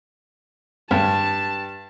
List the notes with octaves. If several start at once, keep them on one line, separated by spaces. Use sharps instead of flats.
G2 A5